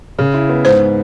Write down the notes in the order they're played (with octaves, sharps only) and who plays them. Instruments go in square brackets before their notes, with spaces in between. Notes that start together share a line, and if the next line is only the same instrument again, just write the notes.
[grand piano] C#3
E4
B3
[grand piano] G#2 [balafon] C5